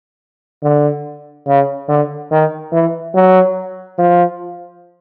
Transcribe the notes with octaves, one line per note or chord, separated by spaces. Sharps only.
D3
C#3
D3
D#3
E3
F#3
F3